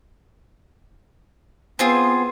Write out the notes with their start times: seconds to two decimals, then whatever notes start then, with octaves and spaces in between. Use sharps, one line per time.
1.79 B3 C4 F4 G#4